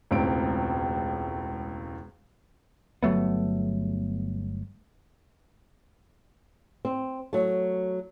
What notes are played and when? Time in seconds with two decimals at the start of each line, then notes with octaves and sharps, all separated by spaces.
0.11 E1 C#2 A2 C4 D7
3.03 G1 F#3 A3 B3
6.85 C4
7.33 F#3 A3